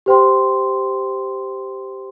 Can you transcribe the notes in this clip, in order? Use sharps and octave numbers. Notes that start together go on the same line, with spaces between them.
G4 C5 G5 C6